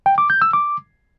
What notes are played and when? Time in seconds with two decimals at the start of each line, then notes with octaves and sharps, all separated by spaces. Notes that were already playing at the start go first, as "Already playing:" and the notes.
0.06 G5
0.18 D6
0.30 G6
0.42 E6
0.53 D6